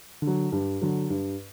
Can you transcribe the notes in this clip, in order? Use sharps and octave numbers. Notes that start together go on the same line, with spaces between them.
D3
F#3
G2
D3 F#3
G2